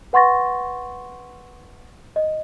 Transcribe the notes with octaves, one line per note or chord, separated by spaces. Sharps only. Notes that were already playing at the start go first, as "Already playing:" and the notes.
B4 F#5 C6 C#6 A6 A#6
D#5